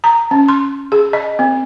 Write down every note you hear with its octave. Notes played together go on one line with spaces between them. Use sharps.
A#5
C#4
C6
G#4
D#5
C4